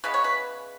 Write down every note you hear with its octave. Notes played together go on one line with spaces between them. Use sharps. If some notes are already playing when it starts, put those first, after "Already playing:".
C#3 E3 G#3 B3 B4
C#5
B4